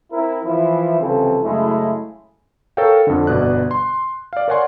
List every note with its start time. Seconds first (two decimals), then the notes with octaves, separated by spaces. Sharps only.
0.12 C4 E4 A#4
0.44 E3 F3 E4
1.01 C2 C#3 E3 F3 C4 A4
1.44 F#2 C#3 G#3 A3 E4
2.77 A4 A#4 C#5 F5 G5
3.07 F2 D3
3.27 G1 B2 D5 F#6
3.71 C6
4.33 D5 F5
4.48 A#4 C#5 D5 F#5 G#5 C6